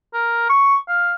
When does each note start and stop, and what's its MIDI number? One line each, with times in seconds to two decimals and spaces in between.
0.14 0.47 70
0.49 0.76 85
0.88 1.14 77